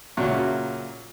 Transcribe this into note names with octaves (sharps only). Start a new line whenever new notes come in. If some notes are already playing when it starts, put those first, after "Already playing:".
A#2 C#3 F#3 F#4 E5 C#6